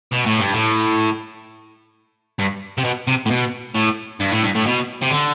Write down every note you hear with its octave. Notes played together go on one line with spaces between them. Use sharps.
B2
A2
G2
A2
G2
C3
B2
C3
A2
B2
A2
G2
A2
G2
A2
B2
C3
D3